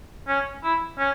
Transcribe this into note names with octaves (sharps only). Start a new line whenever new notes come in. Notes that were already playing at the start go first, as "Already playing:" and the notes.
C#4
E4
C#4